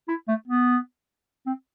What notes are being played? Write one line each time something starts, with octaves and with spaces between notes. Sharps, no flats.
E4
A3
B3
C4